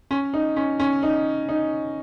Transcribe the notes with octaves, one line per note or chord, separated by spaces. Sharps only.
C#4
D#4
C#4
C#4
D#4
D#4